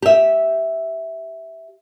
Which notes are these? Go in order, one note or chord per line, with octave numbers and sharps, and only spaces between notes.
G4 E5